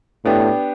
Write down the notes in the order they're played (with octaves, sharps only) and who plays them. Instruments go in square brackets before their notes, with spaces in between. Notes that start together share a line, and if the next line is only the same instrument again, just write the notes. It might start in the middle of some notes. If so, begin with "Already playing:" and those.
[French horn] A2 [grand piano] B3 D4 G4